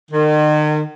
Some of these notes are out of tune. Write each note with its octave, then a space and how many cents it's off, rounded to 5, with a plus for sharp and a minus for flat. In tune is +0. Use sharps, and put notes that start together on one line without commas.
D#3 -40